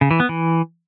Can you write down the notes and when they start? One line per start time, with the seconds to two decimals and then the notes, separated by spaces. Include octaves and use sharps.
0.01 C#3
0.11 E3
0.20 B3
0.29 E3